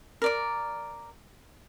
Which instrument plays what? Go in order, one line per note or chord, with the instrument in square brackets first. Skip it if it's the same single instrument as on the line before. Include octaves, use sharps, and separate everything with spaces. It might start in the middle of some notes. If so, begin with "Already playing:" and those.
[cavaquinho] A#4 D5 D6